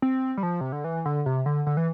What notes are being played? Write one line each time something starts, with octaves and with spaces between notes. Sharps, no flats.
C4
G3
F3
C3
D3
E3
D3
C3
D3
D3
E3